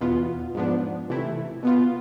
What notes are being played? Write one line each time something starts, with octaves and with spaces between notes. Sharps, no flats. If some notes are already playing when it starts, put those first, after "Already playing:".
E2 B2 B3 F4
G#2 F3 B3 D4
C3 E3 A3 E4
B2 B3 F4